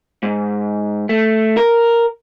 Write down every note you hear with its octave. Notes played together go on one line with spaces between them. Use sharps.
G#2
A3
A#4